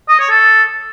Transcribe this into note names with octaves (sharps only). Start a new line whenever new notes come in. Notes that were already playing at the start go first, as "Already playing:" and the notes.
D#5
C#5
A4